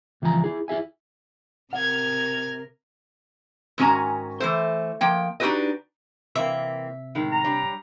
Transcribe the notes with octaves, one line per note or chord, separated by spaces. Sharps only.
C#2 E3 F3 G#5 A#5
E4 G#4
E4 G#4 E5 G#5
C3 A#4 F#5 F6 G#6
G#2 D#3 C#4 F#4 G#5 A#5
E3 A3 C5
F3 A#3 G5
D4 D#4 F#4 G4 B4 D#5
C3 E3 A#3 C4 E5
A2 D#3 G#3
A#5
G3 D4 C#5